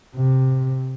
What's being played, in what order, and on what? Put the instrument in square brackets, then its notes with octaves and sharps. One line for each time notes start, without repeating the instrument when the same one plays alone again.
[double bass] C3